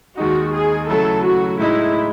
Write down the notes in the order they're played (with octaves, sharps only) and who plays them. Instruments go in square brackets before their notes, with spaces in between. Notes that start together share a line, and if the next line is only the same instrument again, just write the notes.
[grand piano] D#2 D#3 G#3 D#4 [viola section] F#4
[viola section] G#4
[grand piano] C#3 F#3 A3 E4 [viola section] A4
[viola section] F#4
[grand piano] A2 G#3 D#4 [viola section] E4